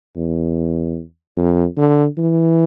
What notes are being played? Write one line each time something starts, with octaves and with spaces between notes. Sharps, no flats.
E2
F2
D3
E3